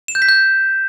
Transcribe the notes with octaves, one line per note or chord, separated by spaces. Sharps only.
E7
G6
B6
G6